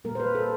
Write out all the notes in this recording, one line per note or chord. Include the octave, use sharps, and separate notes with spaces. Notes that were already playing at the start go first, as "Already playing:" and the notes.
A#2 G3 A#3 A#4
C5
B4
A4